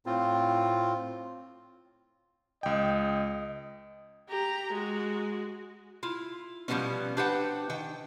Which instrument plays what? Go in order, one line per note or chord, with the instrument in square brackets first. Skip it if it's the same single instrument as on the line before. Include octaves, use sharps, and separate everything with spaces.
[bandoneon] A2 C4 F4
[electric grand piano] C#2 G5 [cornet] D#5
[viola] G4 A#5
G#3 F#4
[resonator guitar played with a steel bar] E4 F4
B2 F3 G3 A#3 B3 C#4
D4 G4 B4 C5 F#5 G5
D#3 G5